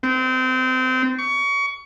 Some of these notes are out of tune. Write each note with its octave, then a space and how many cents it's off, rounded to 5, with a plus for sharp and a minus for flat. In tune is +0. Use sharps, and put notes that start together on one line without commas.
C4 -25
C#6 +25